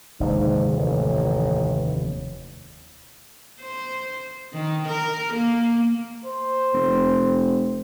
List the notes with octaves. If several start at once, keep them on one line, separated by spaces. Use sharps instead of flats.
F1 D#2 G#2 D3
A1
C5
D#3
A#4
A#3
C5
F1